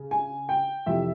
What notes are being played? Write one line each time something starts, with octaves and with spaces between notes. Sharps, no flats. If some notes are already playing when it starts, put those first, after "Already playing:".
Already playing: C#3
G#5
G5
F2 C3 E3 E5